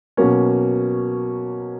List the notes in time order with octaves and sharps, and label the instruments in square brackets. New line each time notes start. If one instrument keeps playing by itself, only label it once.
[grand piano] B2 F#3 A#3 C#4